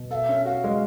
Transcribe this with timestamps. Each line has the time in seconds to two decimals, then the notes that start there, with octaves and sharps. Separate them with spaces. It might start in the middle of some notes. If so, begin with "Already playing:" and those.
Already playing: B2
0.11 A4 F5
0.15 E5
0.29 C#4
0.45 F#4 F5
0.64 G#3